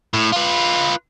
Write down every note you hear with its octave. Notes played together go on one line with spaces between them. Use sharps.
A2
F4 B4